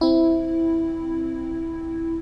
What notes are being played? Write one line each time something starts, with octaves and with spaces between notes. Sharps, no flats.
C4 E4